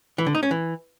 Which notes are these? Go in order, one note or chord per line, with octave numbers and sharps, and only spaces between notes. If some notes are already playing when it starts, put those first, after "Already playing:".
E3
D3
D#4
C#4
E3